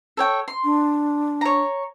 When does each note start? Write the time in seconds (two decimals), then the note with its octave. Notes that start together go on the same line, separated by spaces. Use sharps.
0.17 A4 C#5 G5
0.48 C6
0.64 D4
1.41 C#5 A#5